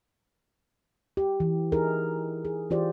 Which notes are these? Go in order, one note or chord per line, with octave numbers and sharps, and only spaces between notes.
G4
E3
D#4 E4 G#4 A#4
G#4
E3 F4 G4 C5 D5